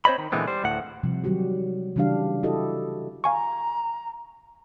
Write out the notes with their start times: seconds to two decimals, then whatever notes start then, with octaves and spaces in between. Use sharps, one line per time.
0.05 C4 C5 C#5 D#5 B5
0.18 D#3
0.32 A#2 D3 E3 G#3 B3 C4
0.47 G3 C5
0.64 D2 A2 F#5
1.03 C3 F3 G3
1.24 D#3 F#3 G3 F#4 G4
1.96 C#3 E3 G3 D4 G4 F5
2.43 E4 F#4 G4 A4 D#5
3.24 F5 G#5 A#5 C#6